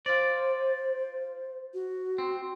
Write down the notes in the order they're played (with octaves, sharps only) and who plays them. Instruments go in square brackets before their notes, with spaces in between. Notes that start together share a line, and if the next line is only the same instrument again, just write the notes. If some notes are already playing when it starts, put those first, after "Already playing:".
[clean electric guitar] F4 D5 [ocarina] C5
[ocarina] F#4
[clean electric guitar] C4